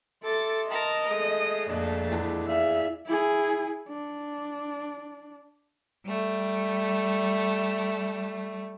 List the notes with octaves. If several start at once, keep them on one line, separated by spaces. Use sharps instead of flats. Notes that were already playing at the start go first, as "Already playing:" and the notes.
A4 E5 C6 D6 A6
A#4 D#5 A5
G#3 A3 D#6
F2 A#2 G#3 A3 D4 D5
E2
G#4 D5 E5 F5
E4 G#4
D4
G3 A3